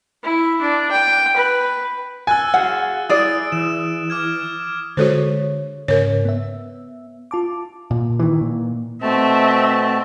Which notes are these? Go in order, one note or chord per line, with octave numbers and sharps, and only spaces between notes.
E4
D4
G5
B4
G#5 E6 F#6 A6
F#4 G#4 F5 F#5
E4 G#4 D5 D#6 D7
E3 E7
D6 F6 G#6
D3 G#3 F#4 A4 C5 C#5
G#2 C#3 A#4 C#5
B3 E5
F4 A5 D6
A#2
D#3 E3
A#2
B2 A3 C4 E5 A5